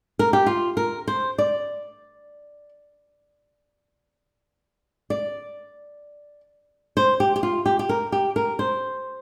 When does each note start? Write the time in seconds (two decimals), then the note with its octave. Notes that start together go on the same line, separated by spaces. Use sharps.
0.19 A#4
0.33 G4
0.46 F4
0.77 A#4
1.08 C5
1.38 D5
5.10 D5
6.97 C5
7.20 G4
7.36 G4
7.43 F4
7.66 G4
7.79 G4
7.89 A#4
8.12 G4
8.36 A#4
8.59 C5